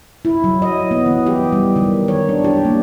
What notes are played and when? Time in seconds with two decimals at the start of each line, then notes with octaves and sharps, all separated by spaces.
0.25 E4
0.44 F#3
0.62 D#5
0.91 B3
1.06 E3
1.26 G4
1.52 G3
1.76 D#3
2.08 C#5
2.29 D4
2.45 G4
2.65 A#3